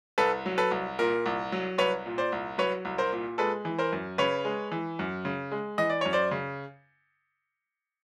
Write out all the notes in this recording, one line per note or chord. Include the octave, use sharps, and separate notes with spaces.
C2 A4 B4
F#3
A4 B4
C2
A#2 A#4
C2
F#3
C2 B4 C#5
A#2
C5 D5
C2
F#3 B4 C#5
C2
A#4 C5
A#2
G#3 A4 B4
E3
A#4 C5
F#2
C#3 B4 C#5
G#3
E3
F#2
C#3
G#3
E3 D#5
D5
F#2 C#5
C5 D5
C#3